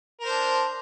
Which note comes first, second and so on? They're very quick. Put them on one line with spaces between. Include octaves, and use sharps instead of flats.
A#4 C5 D4